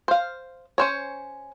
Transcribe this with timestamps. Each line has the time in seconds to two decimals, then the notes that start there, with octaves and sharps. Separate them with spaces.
0.08 C5 F5
0.78 C#4 C5 C#5